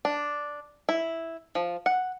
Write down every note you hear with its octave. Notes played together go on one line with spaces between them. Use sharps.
D4
E4
F3
F#5